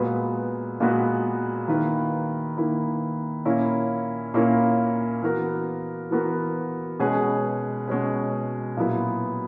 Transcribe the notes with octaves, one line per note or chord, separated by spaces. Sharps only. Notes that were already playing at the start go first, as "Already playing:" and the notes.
Already playing: A#2 G#3 B3 F#4 B4
A#2 G#3 B3 F#4 B4
D#3 A#3 E4 B4
D#3 A#3 E4 B4
A#2 A#3 C#4 E4 A#4
A#2 A#3 C#4 E4 A#4
E3 B3 F#4 A#4
E3 B3 F#4 A#4
B2 G#3 C#4 G#4 B4
B2 G#3 C#4 G#4 B4
A#2 F#3 B3 E4